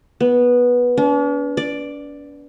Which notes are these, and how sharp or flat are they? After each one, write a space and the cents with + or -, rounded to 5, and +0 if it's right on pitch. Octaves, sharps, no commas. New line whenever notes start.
B3 -10
D4 -45
D5 +5